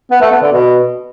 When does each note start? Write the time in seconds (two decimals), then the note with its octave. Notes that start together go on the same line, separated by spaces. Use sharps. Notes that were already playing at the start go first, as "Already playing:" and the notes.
0.11 B3
0.21 A3
0.32 B3
0.42 D3
0.52 B2